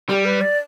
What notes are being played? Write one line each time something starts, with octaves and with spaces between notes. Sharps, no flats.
G3 G4
B4
D5